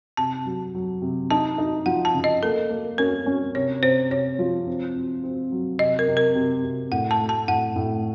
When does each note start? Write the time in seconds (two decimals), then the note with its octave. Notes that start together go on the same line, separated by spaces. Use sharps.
0.17 C3 A5
0.45 F#3
0.75 F#3
1.02 C3
1.31 D#4 A5
1.58 D#4
1.86 F3 F#5
2.05 A5
2.14 C#3
2.24 D#5
2.43 A#3 A4
2.70 A#3
2.98 C#4 A#4
3.26 C#4
3.55 C3 C#5
3.82 C3 C5
4.11 C3 C#5
4.39 F3
4.67 C4
4.96 C4
5.24 C4
5.52 F#3
5.79 C3 D#5
5.99 A#4
6.08 C3
6.17 A#4
6.35 C3
6.64 C3
6.92 A2 F#5
7.11 A5
7.20 A3
7.29 A5
7.48 A2 F#5
7.76 A2